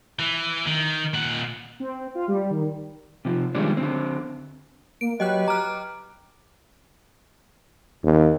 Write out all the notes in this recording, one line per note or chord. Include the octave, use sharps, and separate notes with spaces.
E3
D#3
A#2 F#5
C4
F4
G3
D#3
C3 F3
D#3 F3 G3 G#3 C4 D4
D3 C4
A#3 D7
F#3 G4 B4 D#5 G5 F#6
A#5 D6 F6
D#2